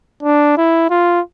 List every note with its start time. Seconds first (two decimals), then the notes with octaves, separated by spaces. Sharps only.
0.23 D4
0.57 E4
0.90 F4